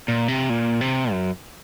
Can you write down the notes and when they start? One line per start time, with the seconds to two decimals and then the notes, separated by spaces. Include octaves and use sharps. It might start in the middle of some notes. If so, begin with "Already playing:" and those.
0.08 A#2
0.28 C3
0.50 A#2
0.81 C3
1.11 F#2